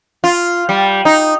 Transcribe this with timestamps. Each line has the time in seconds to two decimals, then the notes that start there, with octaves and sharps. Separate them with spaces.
0.24 F4
0.69 G3
1.05 D#4